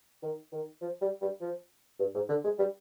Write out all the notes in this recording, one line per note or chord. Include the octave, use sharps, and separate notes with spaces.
D#3
D#3
F3
G3
G3
F3
G2
G#2
D3
G#3
G3